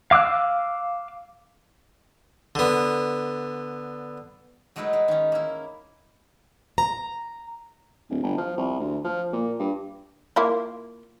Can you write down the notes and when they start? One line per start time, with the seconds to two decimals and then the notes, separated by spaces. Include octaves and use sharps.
0.11 F5 D6 E6 F#6
2.55 D3 B3
4.76 F#3 G#3 A3 D#4 E4 B4
4.93 G#3
5.08 D#3 C#4
5.32 A#3 E4
6.78 A#5
8.09 D1
8.23 G1
8.38 F3
8.57 C2
8.80 D2
9.04 F3
9.33 A#2
9.59 G2
10.36 A#3 E4 F4